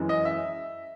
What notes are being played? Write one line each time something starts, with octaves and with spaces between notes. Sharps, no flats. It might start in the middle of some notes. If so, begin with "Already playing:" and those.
Already playing: F#2 E3 G#3
D#5
E5